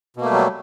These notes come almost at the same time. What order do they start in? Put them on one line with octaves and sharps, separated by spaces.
B2 A#3 A3 G3 F#3